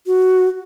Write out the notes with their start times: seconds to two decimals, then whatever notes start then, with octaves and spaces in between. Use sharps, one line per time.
0.07 F#4